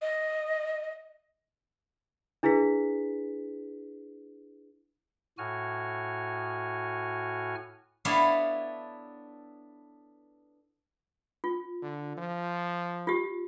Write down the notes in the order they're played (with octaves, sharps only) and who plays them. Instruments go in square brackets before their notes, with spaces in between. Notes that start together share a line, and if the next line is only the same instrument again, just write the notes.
[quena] D#5
[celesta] D4 E4 G#4 B4 B6
[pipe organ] A2 F#4 G#5 F6
[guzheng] B3 D4 E4 A4 C#5 F5
[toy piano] F4
[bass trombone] D3
F3
[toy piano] F4 G4